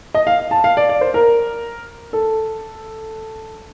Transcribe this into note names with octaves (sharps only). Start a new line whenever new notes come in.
D#5
F5
A5
F5
D5
D5
C5
A#4
A4